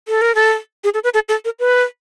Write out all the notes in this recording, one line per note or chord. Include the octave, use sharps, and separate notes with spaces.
A4
A#4
A4
G#4
A4
B4
A4
A4
A#4
B4